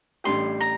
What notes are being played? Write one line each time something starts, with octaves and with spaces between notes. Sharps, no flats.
A1 A2 G3 D4 G4 C6
A#5